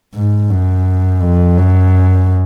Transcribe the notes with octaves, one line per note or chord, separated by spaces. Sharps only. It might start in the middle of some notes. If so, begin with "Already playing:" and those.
G#2
F#2
F2
F#2